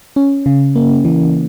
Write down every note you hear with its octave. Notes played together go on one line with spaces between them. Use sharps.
C#4
C#3
A#3
E3